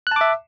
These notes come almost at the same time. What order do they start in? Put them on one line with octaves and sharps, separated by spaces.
F#6 A5 D6 E5